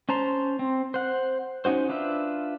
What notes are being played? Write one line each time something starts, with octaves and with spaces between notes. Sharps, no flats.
C#4 C5 A5 A#5 C6
C4
C5 F#5
C#4 D#4 F#4 C5
D4 F4 B4 E5